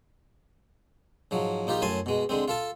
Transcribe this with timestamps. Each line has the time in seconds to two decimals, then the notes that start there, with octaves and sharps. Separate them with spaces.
1.31 G#2 F3 F#3
1.67 A#1 D#4 F4 G4
1.82 F#2 A2 G#5 A5 C6
2.06 B2 G#3
2.29 D3 G#3 C4
2.48 F4 A4 A5